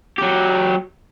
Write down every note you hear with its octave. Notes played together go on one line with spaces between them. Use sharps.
F#3 G4